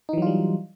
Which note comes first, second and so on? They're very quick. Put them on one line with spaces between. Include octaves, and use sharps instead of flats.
D#4 E3 F#3 F4 G3